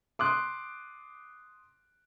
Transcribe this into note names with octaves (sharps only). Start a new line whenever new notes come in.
C6 D6 D#6 F#6